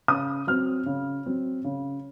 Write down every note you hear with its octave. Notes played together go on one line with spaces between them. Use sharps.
C#3 D#6
F#3 C4 F6
C#3
F#3 C4
C#3